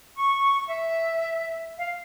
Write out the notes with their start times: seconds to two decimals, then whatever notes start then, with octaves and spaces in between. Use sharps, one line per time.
0.16 C#6
0.67 E5
1.78 F5